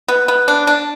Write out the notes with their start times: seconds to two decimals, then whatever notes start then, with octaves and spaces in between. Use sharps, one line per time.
0.08 B3
0.28 B3
0.48 D4
0.67 D4